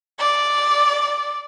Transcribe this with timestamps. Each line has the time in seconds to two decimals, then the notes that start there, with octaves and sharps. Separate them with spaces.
0.19 D5